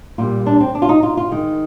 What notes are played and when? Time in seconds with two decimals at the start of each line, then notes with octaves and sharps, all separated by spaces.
0.18 A#2 G3 A#3 F4
0.46 D4
0.60 C4
0.75 D4
0.82 F4
0.89 D#4
1.03 F4
1.17 F4
1.31 D#3 G#3